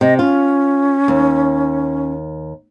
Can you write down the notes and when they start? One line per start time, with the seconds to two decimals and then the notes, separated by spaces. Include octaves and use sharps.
0.01 C3 D#5
0.19 C#4 F4
1.08 D#2